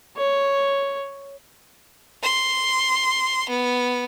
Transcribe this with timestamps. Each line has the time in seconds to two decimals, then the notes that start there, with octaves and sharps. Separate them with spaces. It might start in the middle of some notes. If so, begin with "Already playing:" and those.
0.17 C#5
2.23 C6
3.49 B3